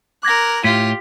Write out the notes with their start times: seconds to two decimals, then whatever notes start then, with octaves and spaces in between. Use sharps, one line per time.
0.23 A#4 D6 F#6 G#6 A#6
0.64 A2 F4 G4 B6